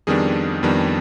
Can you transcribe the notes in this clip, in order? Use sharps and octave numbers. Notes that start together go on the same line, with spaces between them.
F2 D#3 G3 B3 D4 G#4
F2 D#3 G3 B3 D4